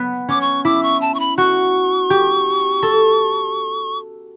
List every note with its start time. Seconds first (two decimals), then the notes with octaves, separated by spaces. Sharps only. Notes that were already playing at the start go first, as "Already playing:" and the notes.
Already playing: B3
0.28 C#4 D6
0.41 C#6
0.65 E4 D6
0.83 C#6
1.01 A5
1.14 C#6
1.20 B5
1.37 F#4 C#6
2.10 G4
2.83 A4